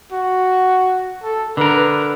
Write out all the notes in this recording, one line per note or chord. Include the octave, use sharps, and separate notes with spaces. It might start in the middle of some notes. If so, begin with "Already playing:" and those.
F#4
A4
D3 A#4 B4